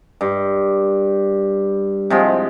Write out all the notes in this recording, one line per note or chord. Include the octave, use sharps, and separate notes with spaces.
G2
C3 F3 G#3